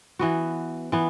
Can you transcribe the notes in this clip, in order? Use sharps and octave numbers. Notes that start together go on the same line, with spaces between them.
E3 B3 F#4
E3 B3